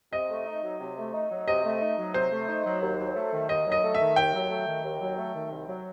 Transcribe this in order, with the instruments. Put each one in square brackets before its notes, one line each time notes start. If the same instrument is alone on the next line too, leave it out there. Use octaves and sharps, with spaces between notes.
[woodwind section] C3 [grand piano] D#5
[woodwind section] A3
D#4
F#3
C3
A3
D#4
F#3
[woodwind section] C3 [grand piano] D#5
[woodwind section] A3
D#4
F#3
[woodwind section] C3 [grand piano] C5
[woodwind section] A3
D#4
F#3
D#2
F#3
A3
D#3
[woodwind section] D#2 [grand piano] D#5
[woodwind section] F#3 [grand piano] D#5
[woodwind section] A3
[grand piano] E5
[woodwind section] D#3
[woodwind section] D#2 [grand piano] G5
[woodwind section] F#3
A3
D#3
D#2
F#3
A3
D#3
C2
F#3